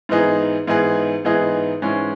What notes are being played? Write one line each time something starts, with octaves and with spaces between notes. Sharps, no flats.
G#2 E3 B3 D#4 G#4
G#2 E3 B3 D#4 G#4
G#2 E3 B3 D#4 G#4
G#2 E3 G#3 C#4